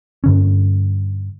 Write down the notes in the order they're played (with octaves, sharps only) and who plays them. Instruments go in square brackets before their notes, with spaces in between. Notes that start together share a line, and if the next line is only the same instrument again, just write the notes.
[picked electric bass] G2 D3 C#4